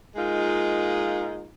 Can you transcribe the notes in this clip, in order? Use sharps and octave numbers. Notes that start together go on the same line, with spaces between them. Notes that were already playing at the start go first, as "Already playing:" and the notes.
G#3 A#3 D#4 F4